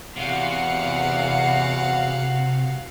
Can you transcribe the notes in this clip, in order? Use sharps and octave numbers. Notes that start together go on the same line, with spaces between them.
E2 C3 F#4 F5 F#5